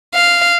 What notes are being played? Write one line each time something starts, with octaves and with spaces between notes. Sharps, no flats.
F5